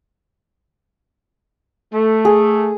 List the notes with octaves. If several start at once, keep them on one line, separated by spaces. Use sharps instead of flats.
A3
G#4